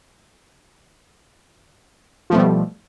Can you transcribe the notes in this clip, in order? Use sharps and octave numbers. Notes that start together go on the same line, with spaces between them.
B2 F3 G3 A3